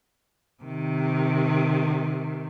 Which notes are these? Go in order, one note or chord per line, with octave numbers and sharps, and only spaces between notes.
C3 D#3